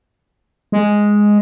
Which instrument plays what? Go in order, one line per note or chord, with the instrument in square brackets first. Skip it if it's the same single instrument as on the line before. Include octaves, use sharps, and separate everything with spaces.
[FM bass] G#3